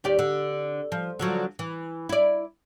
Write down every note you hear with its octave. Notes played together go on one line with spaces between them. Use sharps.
D#2 G4 D5
D3
F3
D3 F3 F#3
E3
E4 D5